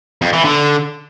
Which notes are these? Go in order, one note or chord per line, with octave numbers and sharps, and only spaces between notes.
F2
E3
D3